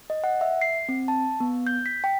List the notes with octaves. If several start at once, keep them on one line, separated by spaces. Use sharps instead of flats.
D#5
F#5
E5
C7
C4
A5
B3
G6
B6
G5